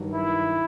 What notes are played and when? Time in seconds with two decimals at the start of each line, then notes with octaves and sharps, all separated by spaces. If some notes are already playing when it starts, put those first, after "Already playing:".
Already playing: G2 D#3 F#3
0.12 E4